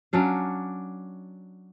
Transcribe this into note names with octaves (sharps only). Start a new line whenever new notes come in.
F#3 C#4 D4 F5